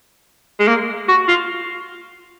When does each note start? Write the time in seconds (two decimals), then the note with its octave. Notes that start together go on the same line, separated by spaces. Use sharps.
0.60 G#3
0.68 A#3
1.09 F#4
1.28 F4